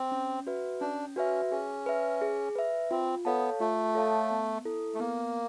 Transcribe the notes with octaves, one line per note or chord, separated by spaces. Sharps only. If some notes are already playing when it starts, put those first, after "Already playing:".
Already playing: C4
C#4
F#4 B4 E5
C#4 D4
C#4 F#4 B4 E5
C#4 G#4
B4 E5
G#4
B4 E5
C4 F4
B3 A4 C#5 F5 A5
A3 F4
A4 C#5 F5 A5
B3
E4 A4
A3
A#3 B3